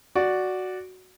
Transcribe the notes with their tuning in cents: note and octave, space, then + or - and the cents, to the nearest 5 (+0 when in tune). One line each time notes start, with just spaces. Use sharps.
F#4 +0 D5 +0